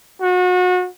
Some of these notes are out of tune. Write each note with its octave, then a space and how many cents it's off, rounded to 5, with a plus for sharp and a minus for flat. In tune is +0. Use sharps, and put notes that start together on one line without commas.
F#4 -30